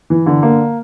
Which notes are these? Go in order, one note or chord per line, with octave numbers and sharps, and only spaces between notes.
E3
D3
A#3